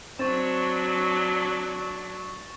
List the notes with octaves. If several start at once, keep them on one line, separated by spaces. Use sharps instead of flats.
F#3 C4 D4 C#6 A6 E7